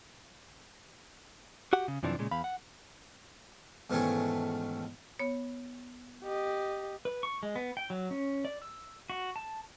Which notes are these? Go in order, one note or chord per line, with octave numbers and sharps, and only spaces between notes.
F#4 G4 F#5
C#3
F#2 C3 E3 F3 D4
A#2 C#3 G#3
E2 F5 B5
F#5
E2 G#2 B2 D#3 A3 C#4
B3 C#5
G4 D#5
B4
C#6
G#3
B3
G5
F#3
C#4
D5
E6
F#4
A5